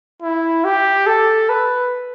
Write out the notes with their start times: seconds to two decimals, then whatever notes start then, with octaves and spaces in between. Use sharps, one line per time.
0.22 E4
0.64 G4
1.07 A4
1.49 B4